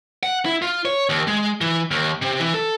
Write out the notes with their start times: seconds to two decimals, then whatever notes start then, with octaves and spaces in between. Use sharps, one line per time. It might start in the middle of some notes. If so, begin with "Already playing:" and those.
0.23 F#5
0.45 E4
0.62 F4
0.85 C#5
1.09 D#2
1.27 G#3
1.61 E3
1.91 D#2
2.22 C3
2.40 E3
2.54 A4